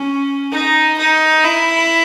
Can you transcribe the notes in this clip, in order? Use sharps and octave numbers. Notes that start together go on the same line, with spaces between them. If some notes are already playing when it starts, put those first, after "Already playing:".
Already playing: C#4
D#4
D#4
E4